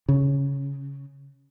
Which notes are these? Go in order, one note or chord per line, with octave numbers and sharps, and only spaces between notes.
C#3